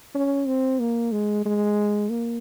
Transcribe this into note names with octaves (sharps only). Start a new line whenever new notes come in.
C#4
C4
A#3
G#3
G#3
A#3